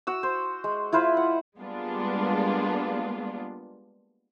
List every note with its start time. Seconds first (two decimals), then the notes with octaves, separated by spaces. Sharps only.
0.07 F#4 E6
0.23 C5
0.64 G#3
0.92 E4 F4 B4 C5
1.17 F#5
1.58 G3 G#3 A#3 B3 D4 F4